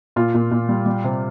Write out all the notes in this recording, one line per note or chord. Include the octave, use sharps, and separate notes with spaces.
A#2 F4
A#2
A#2
G3
G3
C3